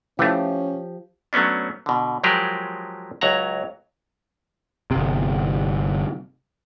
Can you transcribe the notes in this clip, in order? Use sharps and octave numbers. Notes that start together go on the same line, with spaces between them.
E3 F3 A3 C#4 G4
F#3 A3 B3 C#4 D4
B2 D3
F3 F#3 G#3 G4 G#4 A#4
C#2 F#3 C#5 F#5 A#5
G1 C3